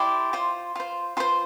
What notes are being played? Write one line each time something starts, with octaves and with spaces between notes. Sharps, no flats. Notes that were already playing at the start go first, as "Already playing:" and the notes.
Already playing: E4 G4 D5 C6
F4 C5
F4 C5
F4 C5 C6